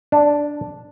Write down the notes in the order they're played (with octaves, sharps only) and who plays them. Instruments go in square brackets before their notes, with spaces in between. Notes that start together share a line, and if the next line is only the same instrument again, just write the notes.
[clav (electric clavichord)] D4